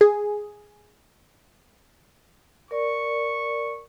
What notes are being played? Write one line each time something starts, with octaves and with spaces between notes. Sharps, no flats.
G#4
A#4 D5 C#6